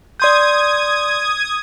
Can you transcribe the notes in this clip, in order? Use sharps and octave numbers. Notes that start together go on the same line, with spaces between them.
D5 C6 D#6 G6 G#6